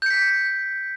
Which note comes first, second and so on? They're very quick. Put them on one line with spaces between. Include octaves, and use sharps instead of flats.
G6 C#7 B6